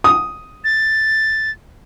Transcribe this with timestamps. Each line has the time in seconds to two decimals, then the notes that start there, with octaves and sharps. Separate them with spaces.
0.04 D#6
0.64 A6